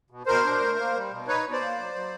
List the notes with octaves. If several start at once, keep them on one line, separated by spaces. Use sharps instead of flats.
B2
B2 A#4 C5
D4
A3
A#3
G3
B2
D#4 B4 C#5
B2
C5 D5
A#3
F#3
F#3